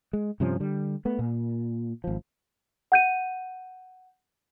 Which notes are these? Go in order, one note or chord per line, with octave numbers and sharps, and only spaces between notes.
G#3
G2 C3 F3 C#4
D3 G3
A3 B3
A#2
G#1 F3
F#5 G6 D#7